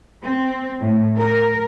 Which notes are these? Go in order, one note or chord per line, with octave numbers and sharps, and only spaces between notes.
C4
A2
A#4